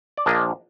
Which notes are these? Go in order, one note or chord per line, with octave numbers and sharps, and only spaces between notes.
D5
A#1 A#2 F3 A#3 D4 D#5